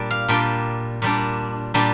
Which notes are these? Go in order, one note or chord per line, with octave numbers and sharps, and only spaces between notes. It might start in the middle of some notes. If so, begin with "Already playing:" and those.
Already playing: A#2 G3 D4 D5
F5
A#2 G3 D4 G5
A#2 G3 D4
A#2 G3 D4